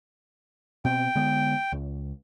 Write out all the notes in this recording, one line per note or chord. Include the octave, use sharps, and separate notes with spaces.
B2 C4 G5
D3 G#3 B3
C#2